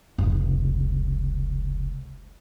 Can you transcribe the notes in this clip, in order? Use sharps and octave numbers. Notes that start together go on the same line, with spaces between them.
F1 C#2